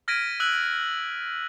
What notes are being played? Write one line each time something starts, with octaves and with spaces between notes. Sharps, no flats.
F6 G#6 A#6 B6 D7 D#7
E6 F#6 F#7